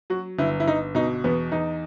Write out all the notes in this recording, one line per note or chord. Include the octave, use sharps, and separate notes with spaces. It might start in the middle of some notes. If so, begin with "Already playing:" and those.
F#3 F#4
G1 E4
E4
G1 D#4
B2 D#4
E2 B3
E2 D#4